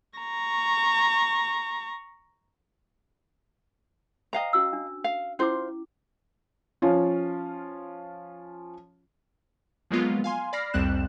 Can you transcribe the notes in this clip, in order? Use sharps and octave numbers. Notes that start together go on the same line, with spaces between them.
A#5 C#6
C5 D#5 F5 G5 A#5
C#4 F#4 E6
D4
F5
C#4 E4 F4 C5 D6
F3 C#4 F4
F3 F#3 G#3 A#3 B3 F4
F5 G#5 C6
D5 B5 F6 A#6 C7
C2 F2 G3 C4 F#6 E7